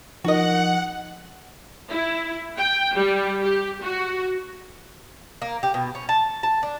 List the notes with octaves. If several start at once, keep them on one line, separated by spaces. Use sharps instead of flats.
F3 D#4 F#4 A#4 D#5 F#5
E4
G5
G3
G4
F#4
A#3
G4
B2
C#4
A5
A5
D4